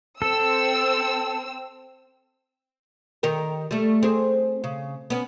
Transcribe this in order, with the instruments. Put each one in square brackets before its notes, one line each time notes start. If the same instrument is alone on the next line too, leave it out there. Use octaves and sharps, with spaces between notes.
[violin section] C4 E6 [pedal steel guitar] A4
[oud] D#3 G4 A#4
G3 A3
C4 G#4
C#3
B3 C#4